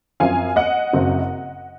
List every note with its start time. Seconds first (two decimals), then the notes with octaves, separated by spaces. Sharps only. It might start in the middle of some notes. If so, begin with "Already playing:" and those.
0.20 F#2 F3 C4 F5 G#5
0.56 D#5 F#5
0.93 F#1 F#2 C#3 F#3 C4